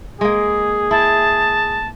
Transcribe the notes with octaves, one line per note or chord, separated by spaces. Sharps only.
G#3 A#3 G#4
E4 A5